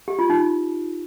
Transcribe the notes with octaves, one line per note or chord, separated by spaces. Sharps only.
G4
F4
D#4